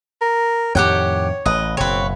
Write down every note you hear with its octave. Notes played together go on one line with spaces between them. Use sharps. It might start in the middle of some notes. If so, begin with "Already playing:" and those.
A#4
F2 A2 D#3 G4 C#5 F#5 G5
A1 B4 D#5
F#1 B2 C4 B4 C#5